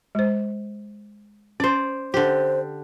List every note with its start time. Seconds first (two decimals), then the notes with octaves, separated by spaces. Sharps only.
0.15 G#3 C5
1.60 C#4 C5 D5
2.14 D3 G4 C5